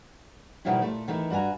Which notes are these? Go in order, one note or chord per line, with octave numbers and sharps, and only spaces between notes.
B2 D#3 F3 G3 E4
A#2 A3
D#3 E3 A3
G2 F#4 A#4 G#5 A#5